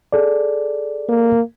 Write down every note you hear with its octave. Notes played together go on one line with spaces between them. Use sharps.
G#4 A4 D5
A#3